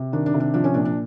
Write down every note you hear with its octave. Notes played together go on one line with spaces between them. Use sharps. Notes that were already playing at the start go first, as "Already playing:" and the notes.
Already playing: C3
D#3 D4
D4
C3
D4
F3 D4
C#4
A#2 D4
D4